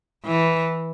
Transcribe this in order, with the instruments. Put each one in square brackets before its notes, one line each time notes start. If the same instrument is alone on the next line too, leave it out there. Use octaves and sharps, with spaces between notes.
[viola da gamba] E3